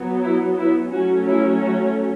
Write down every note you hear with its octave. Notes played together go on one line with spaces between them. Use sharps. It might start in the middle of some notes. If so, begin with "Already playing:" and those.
Already playing: F#3 B3
E4
E4
F#3 A3 C#4 F#4
E4
F#4